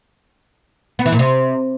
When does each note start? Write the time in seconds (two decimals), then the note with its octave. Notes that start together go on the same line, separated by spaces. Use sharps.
0.99 B3
1.06 E3
1.12 A#2
1.19 C3